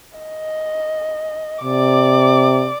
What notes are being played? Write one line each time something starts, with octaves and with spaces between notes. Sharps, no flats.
D#5
C3 D5 D6